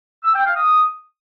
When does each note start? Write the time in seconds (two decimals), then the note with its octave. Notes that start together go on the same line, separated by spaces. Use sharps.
0.24 E6
0.35 G5
0.46 F5
0.56 D#6